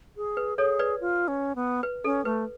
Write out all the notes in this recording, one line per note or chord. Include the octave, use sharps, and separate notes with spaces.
G#4
B4
G#4 A4 C#5
B4 D5
F4
C#4
B3
B4
C#4 A4
A3 B4